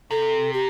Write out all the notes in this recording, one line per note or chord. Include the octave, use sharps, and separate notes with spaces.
C3 A4
G4